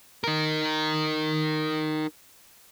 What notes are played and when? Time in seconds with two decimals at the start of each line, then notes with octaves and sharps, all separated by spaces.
0.24 D#4 A#4